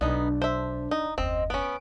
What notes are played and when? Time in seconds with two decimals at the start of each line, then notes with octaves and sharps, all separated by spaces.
0.01 B1 B3 D4 D#4
0.42 C5 E5
0.91 D#4
1.18 F#1 D#2 C4 D#5
1.50 B3 C#4 D7